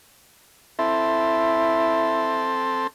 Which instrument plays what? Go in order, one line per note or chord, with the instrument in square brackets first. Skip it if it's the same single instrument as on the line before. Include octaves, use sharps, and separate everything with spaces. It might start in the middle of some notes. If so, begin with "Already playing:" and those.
[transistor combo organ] C4 A4 [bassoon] E4